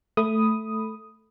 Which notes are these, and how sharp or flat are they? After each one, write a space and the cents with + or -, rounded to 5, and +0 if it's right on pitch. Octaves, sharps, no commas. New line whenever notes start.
A3 +0 B5 +0 D#6 +0